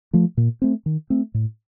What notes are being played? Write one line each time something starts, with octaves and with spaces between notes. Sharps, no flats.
F3 A3
A#2
A3 C4
D#3
A3 C4
A2